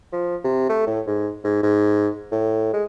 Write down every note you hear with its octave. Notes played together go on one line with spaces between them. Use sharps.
F3
C3
A3
A2
G#2
G#2
G#2
A2
G#3